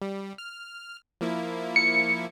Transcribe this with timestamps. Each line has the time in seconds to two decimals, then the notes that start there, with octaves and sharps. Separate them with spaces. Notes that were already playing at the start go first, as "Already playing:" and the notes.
0.02 G3
0.38 F6
1.21 F3 A#3 E4
1.76 C#7